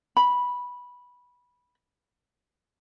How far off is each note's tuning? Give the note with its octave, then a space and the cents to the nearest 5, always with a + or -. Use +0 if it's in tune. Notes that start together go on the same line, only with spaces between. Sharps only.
B5 -10